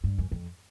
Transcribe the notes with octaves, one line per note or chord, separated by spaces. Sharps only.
G2
F#2
F2